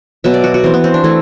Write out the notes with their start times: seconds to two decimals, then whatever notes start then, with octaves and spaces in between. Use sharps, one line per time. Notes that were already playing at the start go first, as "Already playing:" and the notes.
0.24 B2 F#3 B3 E5
0.34 D5
0.44 F#4
0.54 F#4
0.64 E3 B3 C4
0.74 B3
0.84 C4
0.94 D4
1.04 E3 A3 E4